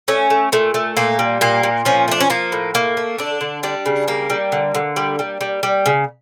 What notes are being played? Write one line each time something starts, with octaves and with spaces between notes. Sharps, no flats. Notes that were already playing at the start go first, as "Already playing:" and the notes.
A3 C#4
A3
A#2 A3
A3
A#2 A#3
G3
A#2 A#3
A#2
F3 C#4
A3 D4
C#4
F3 A#3
A2
A3 A#3
A3
D3 D4
D3
G3 D4
C#3
G3 A#3
G3
D3
D3
G3
G3
G3
G3
C#3